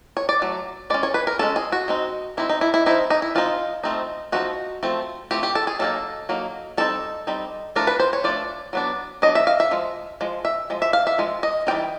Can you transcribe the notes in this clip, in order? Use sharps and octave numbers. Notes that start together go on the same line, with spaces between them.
C#5
D5
F#3 A3
G#3 C#4 D5
C#5
B4
A#4
G#3 C#4 A4
G#4
F#4
G#3 C4 D#4
G#3 C4 D#4 E4
D#4
E4
E4
F3 G#3 C4 D#4 E4
D#4
E4
F3 G#3 C4 D#4 F4
F3 A3 C4 D#4
F3 A3 C4 D#4 F#4
F3 A3 C4
F3 A3 C4 G4
G4
A4
G#4
F#3 A#3 D#4 A4
F#3 A#3 D#4
G3 C4 D#4 A4
G3 C4 D#4
F3 A3 D4 A#4
B4
C5
C#5
F3 A3 D4 D5
F#3 B3 D4
F#3 B3 D4 D#5
E5
F5
E5
F3 G#3
F3 G#3
E5
F3 G#3
E5
F5
E5
F3 G#3
D#5
E3 G3 C4 D#4 G5